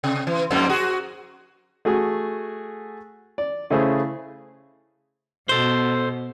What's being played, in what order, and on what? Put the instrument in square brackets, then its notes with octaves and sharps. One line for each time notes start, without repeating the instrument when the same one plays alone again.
[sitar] C3
E3
F2 G#2 A#3
F#4 G#4
[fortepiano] A3 F#4 G#4
D5
C#3 A3 E4 G#4 C5
[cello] B2 [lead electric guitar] A4 C5